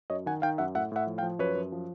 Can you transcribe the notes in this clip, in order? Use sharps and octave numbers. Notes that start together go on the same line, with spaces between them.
F#2 C#5 D#5
D#3 F#5 G#5
D#3 F5 G5
F#2 E5 F#5
A2 E5 F#5
A2 E5 F#5
F3
F5 G5
F3
F#2 B4 C#5
F#2
F3